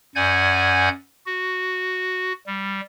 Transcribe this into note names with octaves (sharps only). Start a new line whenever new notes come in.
F#2 D5 F#5 G#5 G6 G#6
F#4
G3